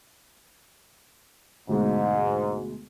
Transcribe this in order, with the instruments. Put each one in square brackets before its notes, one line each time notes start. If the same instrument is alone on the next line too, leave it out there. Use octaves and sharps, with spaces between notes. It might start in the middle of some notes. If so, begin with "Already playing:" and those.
[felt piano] D2 B2 G#3 [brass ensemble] G#2